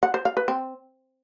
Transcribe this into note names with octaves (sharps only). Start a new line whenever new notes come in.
F#5
C5
F5
B4
C4